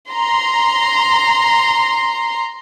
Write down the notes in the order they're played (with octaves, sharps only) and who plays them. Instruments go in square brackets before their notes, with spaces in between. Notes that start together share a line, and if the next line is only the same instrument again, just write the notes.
[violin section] A#5 C6